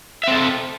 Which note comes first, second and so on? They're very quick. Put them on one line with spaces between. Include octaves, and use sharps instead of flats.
E5 C4 A4